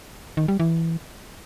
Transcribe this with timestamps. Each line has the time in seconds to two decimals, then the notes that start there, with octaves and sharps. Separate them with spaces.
0.37 D#3
0.48 G3
0.60 E3